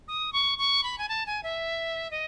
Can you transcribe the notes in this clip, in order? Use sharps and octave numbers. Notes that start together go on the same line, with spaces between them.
D#6
C#6
C#6
B5
G#5
A5
G#5
E5
D#5